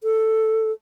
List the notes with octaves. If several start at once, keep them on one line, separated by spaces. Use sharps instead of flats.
A4